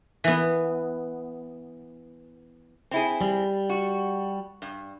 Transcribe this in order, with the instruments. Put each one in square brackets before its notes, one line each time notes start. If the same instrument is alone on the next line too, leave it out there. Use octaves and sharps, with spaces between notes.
[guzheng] E3 B3
[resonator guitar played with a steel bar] C4 E4 G#4
[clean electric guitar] G3
[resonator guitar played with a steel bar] F#4
G2